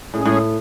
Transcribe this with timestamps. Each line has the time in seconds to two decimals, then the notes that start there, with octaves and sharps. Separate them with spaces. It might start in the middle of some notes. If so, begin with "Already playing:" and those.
0.13 A2 G#3 C#4 G#4
0.25 A2